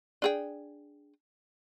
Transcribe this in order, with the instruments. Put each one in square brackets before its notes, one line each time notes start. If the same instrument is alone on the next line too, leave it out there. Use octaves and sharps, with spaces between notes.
[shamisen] D4 G#4 G5